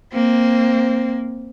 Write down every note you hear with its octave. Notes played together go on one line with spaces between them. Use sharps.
A#3 C4